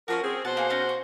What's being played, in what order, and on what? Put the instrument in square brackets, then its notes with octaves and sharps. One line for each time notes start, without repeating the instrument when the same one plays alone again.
[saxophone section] F3 F4 A#4 [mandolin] C#4 D4 F#4
[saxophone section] C4 G#4
[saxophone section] B2 C5 F#5 [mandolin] A5
[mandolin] A#3 G#4
C#4 D#4 A#5
F#4